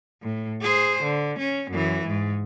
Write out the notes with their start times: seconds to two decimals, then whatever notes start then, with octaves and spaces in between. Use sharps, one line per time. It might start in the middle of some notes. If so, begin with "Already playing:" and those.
0.22 A2
0.62 G#4 C5
1.03 D3
1.39 C#4
1.71 F#2 E3
2.07 G#2